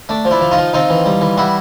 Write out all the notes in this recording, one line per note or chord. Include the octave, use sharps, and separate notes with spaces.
A3 D4
F3
D4 E4
F3
D#4 F4
F3
C4 D#4 F4
E3
G3
E3
G3 E4 F#4